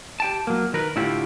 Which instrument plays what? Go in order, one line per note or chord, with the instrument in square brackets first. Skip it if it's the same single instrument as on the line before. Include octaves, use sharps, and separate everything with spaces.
[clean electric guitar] G4 G5 A5
F#3 A#3
D#3 A#4 B4
A2 D3 E4 F4 G4